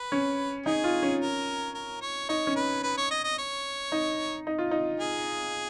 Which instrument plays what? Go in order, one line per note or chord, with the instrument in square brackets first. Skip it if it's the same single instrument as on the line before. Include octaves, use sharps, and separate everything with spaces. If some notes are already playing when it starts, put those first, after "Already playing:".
Already playing: [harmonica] B4
[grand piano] C#4
[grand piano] D#4 [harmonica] G#4
[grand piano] F4
C#4
[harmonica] A#4
A#4
C#5
[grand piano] D#4 [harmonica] C#5
[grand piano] C#4
[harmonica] B4
B4
C#5
D#5
D#5
C#5
[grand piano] D#4
D#4
F4
D#4
[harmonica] G#4